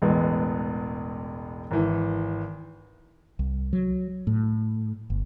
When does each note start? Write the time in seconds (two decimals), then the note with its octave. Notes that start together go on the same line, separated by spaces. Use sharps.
0.02 E1 A1 G#3 B3
1.71 G#1 E3
3.39 C2
3.73 F#3
4.27 A2
5.10 G1